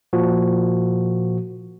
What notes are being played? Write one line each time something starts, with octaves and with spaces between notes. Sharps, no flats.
A#2 F3 F#4